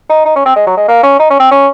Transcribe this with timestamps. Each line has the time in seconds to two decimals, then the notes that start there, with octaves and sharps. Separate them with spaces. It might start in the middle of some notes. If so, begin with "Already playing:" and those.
0.09 D#4
0.25 D#4
0.36 C#4
0.46 C4
0.56 G#3
0.67 F#3
0.77 G#3
0.88 A#3
1.03 C#4
1.19 D#4
1.30 C#4
1.40 C4
1.51 C#4